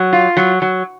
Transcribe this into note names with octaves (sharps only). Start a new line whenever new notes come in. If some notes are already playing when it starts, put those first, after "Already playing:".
Already playing: F#3
F4
F#3
F#3